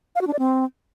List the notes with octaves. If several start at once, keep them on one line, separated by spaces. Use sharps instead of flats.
F5
F#4
D4
D5
C4